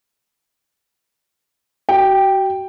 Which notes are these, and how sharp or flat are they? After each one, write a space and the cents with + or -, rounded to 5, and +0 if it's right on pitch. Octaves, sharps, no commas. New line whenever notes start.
F#4 +35 G5 +0